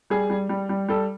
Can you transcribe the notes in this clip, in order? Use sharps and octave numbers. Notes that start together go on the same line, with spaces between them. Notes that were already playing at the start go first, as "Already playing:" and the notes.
G3 G#4
G3
G3
G3
G3 A4